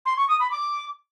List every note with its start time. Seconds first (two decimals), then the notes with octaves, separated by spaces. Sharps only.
0.06 C6
0.17 C#6
0.28 D#6
0.40 B5
0.51 D6